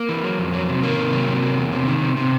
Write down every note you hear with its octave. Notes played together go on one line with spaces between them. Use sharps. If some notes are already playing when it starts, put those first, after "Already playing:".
Already playing: A#3
E3
F#3
F2
F#3
C3
D#3 A#3
C3
F#3
C3
F#3
E2
C3
D#3
C3
C3